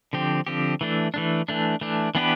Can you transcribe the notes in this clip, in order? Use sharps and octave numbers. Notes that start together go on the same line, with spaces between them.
D3 F3 C4 G4
D3 F3 C4 G4
E3 A3 D4
E3 A3 D4
E3 A3 D4
E3 A3 D4
E3 B3 D4 G4 B4